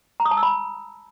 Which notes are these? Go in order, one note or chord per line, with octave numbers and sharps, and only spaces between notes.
A#5
D#6
A5
E6
B5